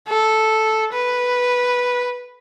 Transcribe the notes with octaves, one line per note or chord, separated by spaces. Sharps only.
A4
B4